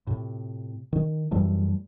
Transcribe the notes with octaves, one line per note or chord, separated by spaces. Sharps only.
A2 C3
D#3
F#2 E3 G3 A3